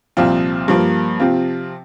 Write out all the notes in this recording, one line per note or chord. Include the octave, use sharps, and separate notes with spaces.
C2 A#2 F3 C4 F4
G2 F3 A#3
C3 F3 C4 F4